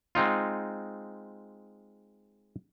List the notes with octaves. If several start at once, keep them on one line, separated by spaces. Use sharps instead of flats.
G#3 C4 D#4 F4